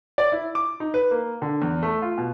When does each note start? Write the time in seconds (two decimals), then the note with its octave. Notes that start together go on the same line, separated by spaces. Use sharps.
0.18 D5
0.32 E4
0.55 D6
0.80 D#4
0.94 B4
1.11 A#3
1.42 D3
1.62 E2
1.83 A3
2.02 F4
2.18 B2